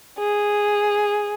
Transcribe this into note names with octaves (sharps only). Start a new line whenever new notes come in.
G#4